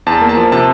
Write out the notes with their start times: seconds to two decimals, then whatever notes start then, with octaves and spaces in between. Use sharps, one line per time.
0.06 E2 A5
0.21 A#3
0.29 A5
0.37 F3
0.52 C3 A5